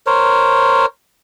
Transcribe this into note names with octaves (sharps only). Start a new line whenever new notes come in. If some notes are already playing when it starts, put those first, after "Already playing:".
A#4 C5 C#5